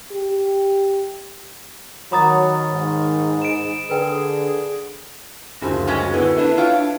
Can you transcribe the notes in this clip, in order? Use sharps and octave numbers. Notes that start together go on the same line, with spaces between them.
G4
D#3 F#3 C#5 A#5 B5 D6 D#6 A6
G#2
D7 E7
D3 G#4 A#4 B4 G5
F#1 D2 F3 F#4
G3 G#3 C#4
A2 D3 B3
D4 E4 B4
F4 C#5 G5